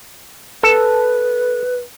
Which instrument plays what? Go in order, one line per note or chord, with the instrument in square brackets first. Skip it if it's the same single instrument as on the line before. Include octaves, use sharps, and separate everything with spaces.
[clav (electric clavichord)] A4 [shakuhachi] B4